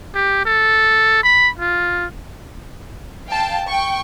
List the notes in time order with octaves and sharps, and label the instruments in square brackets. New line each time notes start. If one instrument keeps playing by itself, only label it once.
[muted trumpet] G4
A4
B5
F4
[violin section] F5 G5 A5
G5 C#6